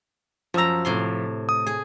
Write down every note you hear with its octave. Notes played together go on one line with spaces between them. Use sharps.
F#2 F3 A#5 E6
A2 C3 C6
D#6
G#4